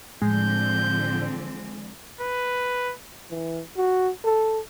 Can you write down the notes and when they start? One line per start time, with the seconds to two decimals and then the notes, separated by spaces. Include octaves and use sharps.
0.22 A2 D3 F3 G#3 C4 G6
2.21 B4
3.30 E3
3.77 F#4
4.25 A4